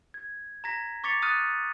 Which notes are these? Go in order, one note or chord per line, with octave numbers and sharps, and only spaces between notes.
G#6
A#5 G#6 A#6 B6
C#6 D6 A6 B6 C#7 F7
D#6 F6 F#6 A6 D#7